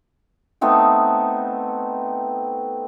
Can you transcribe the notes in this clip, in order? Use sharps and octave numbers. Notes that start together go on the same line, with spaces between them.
A3 B3 C4 D#4